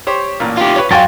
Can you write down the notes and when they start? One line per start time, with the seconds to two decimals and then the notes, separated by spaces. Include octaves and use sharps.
0.07 G4 C5 C#5
0.40 A1 A#2
0.57 F4 G4
0.76 B4 C#5
0.91 F#2 F#4 F5 G5 G#5 C6 C#6 A6